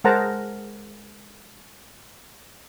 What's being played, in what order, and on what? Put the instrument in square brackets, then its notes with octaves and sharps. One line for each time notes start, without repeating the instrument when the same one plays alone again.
[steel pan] G#3 A#4 C5 F#5 A5 A#5